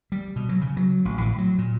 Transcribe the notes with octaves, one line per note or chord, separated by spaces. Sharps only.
G3
B2
F#3
C#3
F#3
A1
A2
F#3
A#2